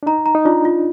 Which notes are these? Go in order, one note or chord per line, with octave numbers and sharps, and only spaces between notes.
D4
D#4 A#5
A#5
D#4
D4 F4
F4